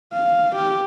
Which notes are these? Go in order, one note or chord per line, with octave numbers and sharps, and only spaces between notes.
F5
G4